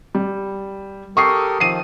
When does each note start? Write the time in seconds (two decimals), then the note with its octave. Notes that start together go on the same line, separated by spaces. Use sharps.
0.15 G3
1.17 G4 A4 A#4 C#6 D#6 C7
1.60 D#3 F3 C7 D#7